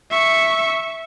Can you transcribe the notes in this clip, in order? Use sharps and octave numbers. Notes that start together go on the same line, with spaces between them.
E5 C#6